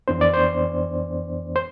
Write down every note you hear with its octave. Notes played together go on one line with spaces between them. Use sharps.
F2 E3 B3 D4 C5
D5
C5
C5